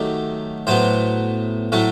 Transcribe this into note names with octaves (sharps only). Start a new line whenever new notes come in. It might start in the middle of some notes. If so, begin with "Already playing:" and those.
Already playing: D#3 F#3 A3 G4
A2 F#3 B3 C5
A2 F#3 A3